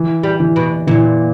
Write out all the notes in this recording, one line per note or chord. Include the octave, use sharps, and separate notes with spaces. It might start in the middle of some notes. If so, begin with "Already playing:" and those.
Already playing: E3
G3
E3
B2
A#2 E3